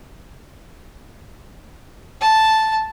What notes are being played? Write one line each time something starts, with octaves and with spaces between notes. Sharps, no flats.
A5